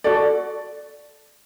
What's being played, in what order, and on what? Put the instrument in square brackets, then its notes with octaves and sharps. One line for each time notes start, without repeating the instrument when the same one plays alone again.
[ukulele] F#4 A4 D5